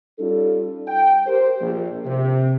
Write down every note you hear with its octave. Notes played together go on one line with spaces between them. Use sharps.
G3 C#4 D#4 F4 A4
G5
G4 A#4 C5
A#1
C3